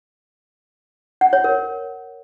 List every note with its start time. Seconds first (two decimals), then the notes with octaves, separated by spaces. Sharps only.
1.21 F#5
1.33 C#5
1.44 A#4